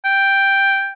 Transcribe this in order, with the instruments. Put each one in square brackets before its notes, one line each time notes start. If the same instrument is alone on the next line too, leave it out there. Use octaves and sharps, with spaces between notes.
[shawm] G5